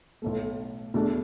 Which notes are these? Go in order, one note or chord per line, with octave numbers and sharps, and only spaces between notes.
B1 A2 A3
E2 B2 A3 D4